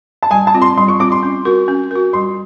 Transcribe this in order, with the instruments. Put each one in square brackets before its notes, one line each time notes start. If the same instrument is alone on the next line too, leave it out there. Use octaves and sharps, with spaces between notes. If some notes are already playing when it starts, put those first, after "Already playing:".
[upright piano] A5
[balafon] G3 [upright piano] G#5
[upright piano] A5
[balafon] C4 F4
[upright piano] C6
[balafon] G3 [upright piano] C6
[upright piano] C#6
[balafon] C4 F4 [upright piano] D6
[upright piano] C6
[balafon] C#4
F#4 A#4
C#4
F#4 A#4
[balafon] G3 [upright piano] C6